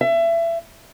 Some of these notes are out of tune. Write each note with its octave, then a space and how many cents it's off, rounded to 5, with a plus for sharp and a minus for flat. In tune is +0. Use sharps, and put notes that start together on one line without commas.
E5 +25